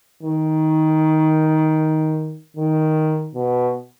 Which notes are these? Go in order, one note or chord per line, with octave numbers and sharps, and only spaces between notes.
D#3
D#3
B2